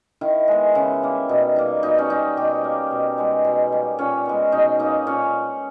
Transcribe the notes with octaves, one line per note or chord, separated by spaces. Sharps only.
D#3 E4
G#3 B3
C#3 E4
G3 A#3
B2 D#4
G3 A#3 D#4
B2 D#4
C#4
G3 A#3 D#4
B2 G4
A#3
B2
G#3 B3
B2
G3 A#3
A#2 C#4
G#3 B3
B2 D#4
A#3 D#4
A#2 C#4